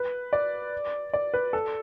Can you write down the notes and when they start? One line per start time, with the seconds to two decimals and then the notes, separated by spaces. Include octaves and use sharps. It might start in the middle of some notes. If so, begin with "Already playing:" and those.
Already playing: B4
0.33 D5
1.13 D5
1.34 B4
1.53 A4